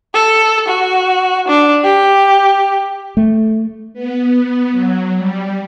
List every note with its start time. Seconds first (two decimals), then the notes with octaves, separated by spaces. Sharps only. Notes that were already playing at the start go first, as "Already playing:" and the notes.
0.14 A4
0.68 F#4
1.48 D4
1.84 G4
3.17 A3
3.93 B3
4.71 F#3
5.16 G3